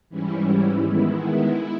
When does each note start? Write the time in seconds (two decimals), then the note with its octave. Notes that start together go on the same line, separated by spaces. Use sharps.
0.09 G#2 E3 G3 C#4 E4
0.78 D#3 G#3 B3 E4
1.48 E4